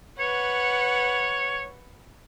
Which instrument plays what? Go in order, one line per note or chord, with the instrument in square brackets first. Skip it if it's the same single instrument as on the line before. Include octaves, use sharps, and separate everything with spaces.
[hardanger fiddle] B4 F#5 [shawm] C#5